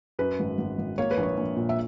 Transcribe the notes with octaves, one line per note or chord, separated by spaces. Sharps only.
F#2 B4
G#1
G#1
G#1
A#3 C#5
B4
A#1
C#5
A#1
A#2
E5